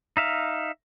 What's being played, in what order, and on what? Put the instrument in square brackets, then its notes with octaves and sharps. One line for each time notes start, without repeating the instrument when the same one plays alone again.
[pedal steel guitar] D#4 E5 F5